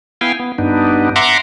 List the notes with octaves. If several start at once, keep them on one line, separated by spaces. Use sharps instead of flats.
B3 E4 F5 G5 G#5
B3
G2 B3 D4 D#4
E5 F#5 A#5 C6 D6